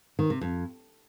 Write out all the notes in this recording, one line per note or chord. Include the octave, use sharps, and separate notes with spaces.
D#3
C3
F2